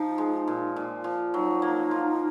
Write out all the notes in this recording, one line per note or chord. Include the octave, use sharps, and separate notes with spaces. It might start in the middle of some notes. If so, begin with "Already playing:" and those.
Already playing: F3 D#4
G#3
A#2
A#2
F3
F#3 D#4
A#3
F4